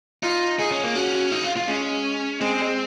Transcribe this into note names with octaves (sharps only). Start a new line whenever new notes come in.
D#4 F4
D#4 G#4
C#4
A#3
C#4 F#4
D#4
F4
F4
G#3 C#4
G#3 C4